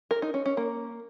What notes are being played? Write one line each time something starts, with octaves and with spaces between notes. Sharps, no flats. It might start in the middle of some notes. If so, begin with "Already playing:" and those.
A#4
D#4
C#4
C#4
A#3